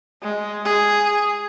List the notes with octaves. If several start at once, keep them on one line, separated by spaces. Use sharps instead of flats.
G#3
G#4